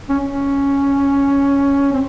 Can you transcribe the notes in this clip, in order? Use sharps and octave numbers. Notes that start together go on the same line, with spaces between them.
C#4
C#4
C4